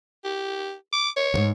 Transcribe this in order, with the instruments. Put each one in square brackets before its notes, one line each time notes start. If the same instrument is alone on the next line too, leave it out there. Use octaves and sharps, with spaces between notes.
[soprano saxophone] G4
D6
C#5
[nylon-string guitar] D#2 G#2